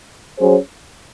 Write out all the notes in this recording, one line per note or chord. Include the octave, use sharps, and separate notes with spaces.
F#3 C#4 G#4 C5